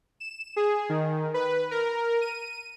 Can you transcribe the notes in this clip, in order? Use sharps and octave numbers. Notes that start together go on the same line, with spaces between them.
E7
G#4
D#3
B4
A#4
D#7